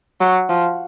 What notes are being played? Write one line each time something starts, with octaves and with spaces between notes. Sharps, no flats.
F#3
F3